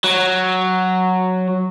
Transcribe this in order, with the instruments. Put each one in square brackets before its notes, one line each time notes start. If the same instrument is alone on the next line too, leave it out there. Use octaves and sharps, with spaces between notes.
[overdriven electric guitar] F#3